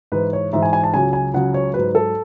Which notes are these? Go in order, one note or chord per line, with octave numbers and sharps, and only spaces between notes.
G#2 E3 B4
C#5
G#2 E3 E5
G#5
G#5
A5
C#2 C#3 F#3 G#5
G#5
C#2 C#3 F#3 F#5
C#5
G#2 F#3 B4
A4